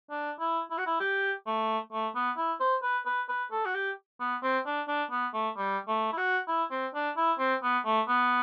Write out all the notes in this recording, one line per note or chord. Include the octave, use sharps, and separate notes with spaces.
D4
E4
E4
F#4
E4
G4
A3
A3
B3
E4
C5
B4
B4
B4
A4
F#4
G4
B3
C4
D4
D4
B3
A3
G3
A3
E4
F#4
E4
C4
D4
E4
C4
B3
A3
B3